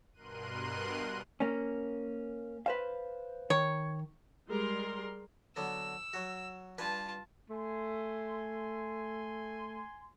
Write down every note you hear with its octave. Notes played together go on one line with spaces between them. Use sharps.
G2 B2 A#4 C6 F#6 D#7
A#3 C#4
B4 C5 F5
D#3 C#5
G3 G#3 A#4 C6
D3 F#3 B3 E6
F#3 F#4
G2 F4 B4 G#5 A5
A3 G#5 C6